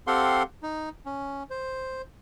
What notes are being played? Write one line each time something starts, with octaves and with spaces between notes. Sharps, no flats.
C4 G4 A4 F5 F#5 C6
D#4
C#4
C5